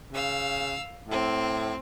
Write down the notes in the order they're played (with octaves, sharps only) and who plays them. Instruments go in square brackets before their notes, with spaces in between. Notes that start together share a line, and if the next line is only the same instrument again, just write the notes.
[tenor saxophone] C#3 [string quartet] F5 E6
[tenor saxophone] A2 [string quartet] C4